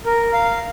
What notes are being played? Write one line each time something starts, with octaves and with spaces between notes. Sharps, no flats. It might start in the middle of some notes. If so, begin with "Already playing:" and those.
A#4
F5